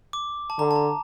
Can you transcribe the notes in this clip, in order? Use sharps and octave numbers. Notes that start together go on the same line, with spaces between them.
D6
A5
D3 A#5
A5
A#5